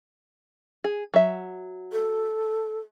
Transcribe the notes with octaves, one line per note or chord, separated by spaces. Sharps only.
G#4
F#3 E5
A4